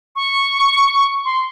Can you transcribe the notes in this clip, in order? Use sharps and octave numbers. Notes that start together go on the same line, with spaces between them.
C#6
C6